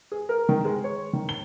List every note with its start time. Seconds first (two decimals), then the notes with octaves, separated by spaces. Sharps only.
0.12 G#4
0.29 A#4
0.49 D#3
0.65 G#3
0.84 C#5
1.13 D#3
1.29 G7